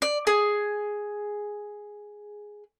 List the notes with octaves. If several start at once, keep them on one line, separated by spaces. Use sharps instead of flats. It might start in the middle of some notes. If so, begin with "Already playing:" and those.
D5
G#4